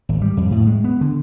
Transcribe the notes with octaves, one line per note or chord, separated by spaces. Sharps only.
G#1
G3
F2
A2
G#3
B3
D3